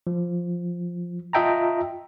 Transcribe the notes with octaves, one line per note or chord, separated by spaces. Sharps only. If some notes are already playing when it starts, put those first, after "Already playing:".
F3
F4 D#5 E5 G5 A5 A#5